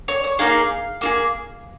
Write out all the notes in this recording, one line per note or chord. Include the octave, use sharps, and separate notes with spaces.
C#5
C#5
A#3 D#4 G#4 F5
A#3 F4 G#4